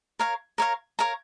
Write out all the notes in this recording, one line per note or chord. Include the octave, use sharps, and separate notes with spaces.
A#4 C#5 F5 A#5
A#4 C#5 F5 A#5
A#4 C#5 F5 A#5